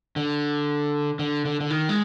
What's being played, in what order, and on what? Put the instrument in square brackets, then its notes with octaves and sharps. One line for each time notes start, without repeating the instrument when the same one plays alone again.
[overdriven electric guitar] D3
D3
D3
D3
D#3
G#3